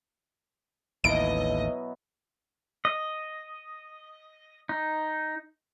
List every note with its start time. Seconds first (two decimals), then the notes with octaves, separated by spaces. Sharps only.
1.04 A1 D#2 B2 F#3 E4 D#5 D7
2.85 D#5
4.69 D#4